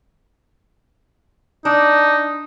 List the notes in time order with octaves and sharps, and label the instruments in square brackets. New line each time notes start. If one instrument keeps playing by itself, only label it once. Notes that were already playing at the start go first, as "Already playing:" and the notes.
[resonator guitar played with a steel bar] D4 [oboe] D#4